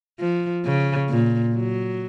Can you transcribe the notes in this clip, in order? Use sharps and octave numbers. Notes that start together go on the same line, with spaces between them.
F3
C#3
A#2
F#3